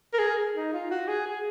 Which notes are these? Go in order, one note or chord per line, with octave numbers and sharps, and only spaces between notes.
A#4
G#4
D#4
F4
F#4
G#4
G#4